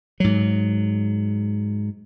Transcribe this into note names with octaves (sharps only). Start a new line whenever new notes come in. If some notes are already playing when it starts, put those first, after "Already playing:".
G#2 F#3